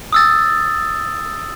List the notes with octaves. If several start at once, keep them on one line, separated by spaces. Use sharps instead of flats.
D#6 E6 A6